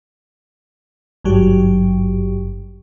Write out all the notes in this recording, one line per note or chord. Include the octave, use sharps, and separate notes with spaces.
G#1 G2 F#3 G4